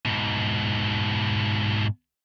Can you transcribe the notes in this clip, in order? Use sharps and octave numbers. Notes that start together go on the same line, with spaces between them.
G#2 B2